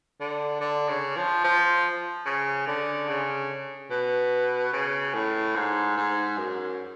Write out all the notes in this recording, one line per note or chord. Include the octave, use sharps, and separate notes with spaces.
D3
D3
C#3
F3
F3
C#3
D3
C#3
B2
C#3
A2
G#2
G#2
F#2